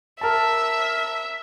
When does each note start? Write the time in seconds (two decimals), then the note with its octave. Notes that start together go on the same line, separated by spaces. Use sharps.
0.21 A#4 E5 A5